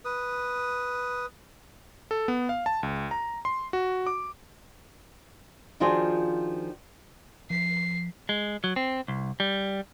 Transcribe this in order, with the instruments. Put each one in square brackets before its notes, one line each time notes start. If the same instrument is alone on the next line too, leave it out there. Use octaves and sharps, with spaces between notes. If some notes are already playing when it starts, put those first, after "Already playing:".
[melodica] B4 D#6
[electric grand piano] A4
B3
F5
A5
C#2
A#5
C6
F#4
D6
[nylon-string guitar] D#3 F3 D4 F4 F#4 G#4
[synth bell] F3 B6 [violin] C7
[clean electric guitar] G#3
F#3
C4
C2
G3